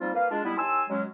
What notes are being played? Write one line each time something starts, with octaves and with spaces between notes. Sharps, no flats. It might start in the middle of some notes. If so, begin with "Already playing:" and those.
F3 G3 A#3 C4 D#4 F4
A#3 B4 F5
G#3 D4 F4
G3 B3 E4
D#2 G#5 A5 C6 E6
F#3 G#3 C#4